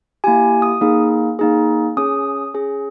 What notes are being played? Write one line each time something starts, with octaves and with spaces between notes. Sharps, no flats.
A#3 E4 G4 G#5
D#6
A#3 D#4 G#4
A#3 D#4 G#4
C#4 G#4 D#6
C#4 G#4